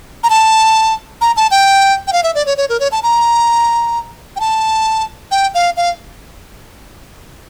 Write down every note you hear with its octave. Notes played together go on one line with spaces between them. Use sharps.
A#5
A5
A#5
A5
G5
G5
F5
E5
D5
C#5
C#5
A#4
C#5
A5
A#5
G5
A5
G5
F5
F5